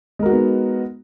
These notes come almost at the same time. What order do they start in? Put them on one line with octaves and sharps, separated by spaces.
G#3 A#4 F#4 D#4 B3